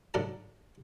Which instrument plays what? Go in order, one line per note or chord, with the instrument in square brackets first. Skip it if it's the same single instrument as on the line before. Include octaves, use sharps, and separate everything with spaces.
[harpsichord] G#2 D3 F#3 F#4 D5 A5